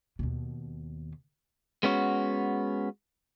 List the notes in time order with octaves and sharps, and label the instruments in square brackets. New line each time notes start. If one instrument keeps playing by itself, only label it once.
[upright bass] D#2 B2
[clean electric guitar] G#3 B3 C#4 F#4